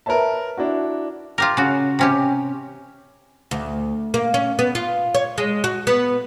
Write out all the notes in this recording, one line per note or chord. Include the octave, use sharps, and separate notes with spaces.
A#4 B4 C#5 E5 A5
D4 E4 F#4
F4 G4 A#4
C#3 F#4
C3 C#4 G4
D2
A#3
C#4
B3
F4
C#5
G#3
F#4
B3